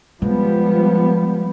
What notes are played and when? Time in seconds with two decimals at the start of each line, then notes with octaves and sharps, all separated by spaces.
0.22 F3 G3 G#3 B3